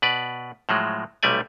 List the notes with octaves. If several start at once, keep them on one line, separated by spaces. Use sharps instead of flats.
B2 B4 D5
A2 F3 F#3 G#3
B1 C3 G3 A3 D5 G#5